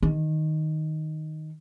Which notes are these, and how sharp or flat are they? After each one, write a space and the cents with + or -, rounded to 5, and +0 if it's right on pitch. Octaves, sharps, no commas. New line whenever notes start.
D#3 +0